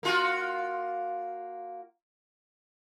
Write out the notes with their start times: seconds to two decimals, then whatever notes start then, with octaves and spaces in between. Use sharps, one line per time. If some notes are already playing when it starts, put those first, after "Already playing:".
0.03 A#3 F4 F#4